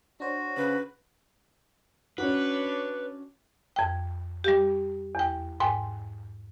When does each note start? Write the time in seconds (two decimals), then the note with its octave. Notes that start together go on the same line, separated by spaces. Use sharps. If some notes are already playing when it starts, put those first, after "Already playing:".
0.20 D4 F#4 C5 C#5
0.57 C#3 B4
2.18 C#4 D4 F#4 B4 C#5
3.76 F2 G5
4.44 G3 G4
5.15 E2 G5
5.60 G#2 G5 G#5